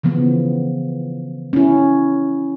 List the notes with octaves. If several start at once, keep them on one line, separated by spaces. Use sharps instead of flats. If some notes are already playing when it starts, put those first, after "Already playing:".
C#3 E3 F3 B3
C#4 E4